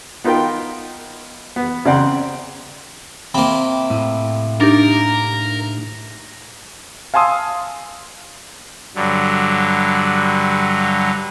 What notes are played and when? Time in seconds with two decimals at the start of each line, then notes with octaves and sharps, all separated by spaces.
0.24 B3 D#4 F4 A#4 G5
1.56 B3
1.85 C#3 C4 D5 F#5 A#5 C6
3.34 C3 A#3 G5 B5
3.90 A2
4.61 D4 D#4 G4 A#4
7.14 F5 G#5 A5 C6 D#6 E6
8.95 G2 D3 F#3